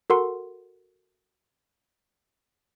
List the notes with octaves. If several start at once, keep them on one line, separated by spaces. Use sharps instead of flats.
F#4 A4 A#4 F#5 C6